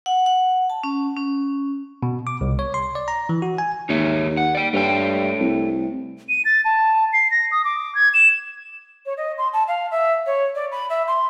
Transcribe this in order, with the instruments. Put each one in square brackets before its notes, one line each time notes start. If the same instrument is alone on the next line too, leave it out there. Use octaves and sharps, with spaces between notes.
[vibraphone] F#5
F#5
A5
C#4
C#4
[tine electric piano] B2
D6
C2
C#5
C6
D5
A#5
E3
F#4
G#5
[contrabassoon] D#2 [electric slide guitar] D#4 C#5 E5
[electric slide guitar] F#5
D5 G5
[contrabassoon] G2 [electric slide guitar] A3 C#5 G5
[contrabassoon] C2
[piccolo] D#7
A6
A5
C7
A#6
D#6
D6
G#6
E7
[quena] C#5
D#5
C6
A5
F5
E5
C#5
D5
B5
E5
C6